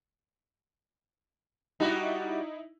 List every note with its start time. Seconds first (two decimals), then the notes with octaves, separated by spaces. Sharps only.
1.80 G3 D#4 E4 F#4